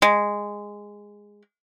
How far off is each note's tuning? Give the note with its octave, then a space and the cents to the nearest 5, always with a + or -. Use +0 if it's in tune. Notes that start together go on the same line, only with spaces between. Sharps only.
G#3 -10